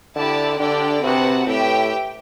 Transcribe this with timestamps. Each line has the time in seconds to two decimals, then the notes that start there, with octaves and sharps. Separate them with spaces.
0.15 D3 E4 G4 D5 A5
0.59 D3 D4 G4 D5 G5
1.03 C3 C4 F#4 B4 F#5 A5
1.47 A2 G4 B4 E5 G5